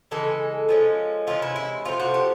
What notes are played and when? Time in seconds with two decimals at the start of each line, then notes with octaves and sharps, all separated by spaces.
0.11 C#3 E3 G#3 A4
0.69 F3 G#3 C#4
1.27 C3 E3 G#3 C#4 F4
1.42 E4
1.56 E4
1.85 C3 F3 A3 C4 F4
2.00 F#4
2.14 G4